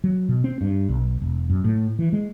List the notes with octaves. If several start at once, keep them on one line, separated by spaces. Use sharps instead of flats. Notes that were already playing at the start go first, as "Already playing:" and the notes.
F#3
B2
C4
G2
B1
E1
F#2
A2
E3
G#3